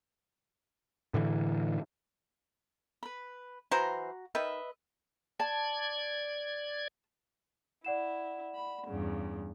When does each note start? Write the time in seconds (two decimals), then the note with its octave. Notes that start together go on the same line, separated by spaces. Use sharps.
1.14 A2 D3 E3
3.03 B4 B5
3.71 E3 F#3 F#4 C5 A#5
4.35 D#3 B4 D#5 E5
5.40 D5 A5 G#6
7.85 E4 D5 F#5 E7
8.54 B5
8.87 E2 G2 C#3